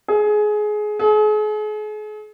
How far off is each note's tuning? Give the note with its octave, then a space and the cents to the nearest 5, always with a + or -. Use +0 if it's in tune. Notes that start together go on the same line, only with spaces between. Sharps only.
G#4 +20
G#4 +40